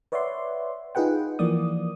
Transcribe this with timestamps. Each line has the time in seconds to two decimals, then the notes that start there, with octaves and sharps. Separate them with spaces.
0.12 B4 C#5 D5 E5 F#5 C6
0.95 D#4 F4 G#4 B4 F#5 G5
1.39 E3 F3 A#3 D5 D#6